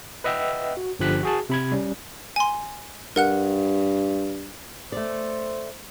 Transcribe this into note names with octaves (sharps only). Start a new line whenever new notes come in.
B4 D#5 E5 F#5 G5 E6
F#4
G1 D3 F3 G4 F#6 B6
F#4 G#4 A5
C3 B5 G#6
G3 C#4
G#5 C6
G2 A#4 F#5 F#6
A3 C5 D5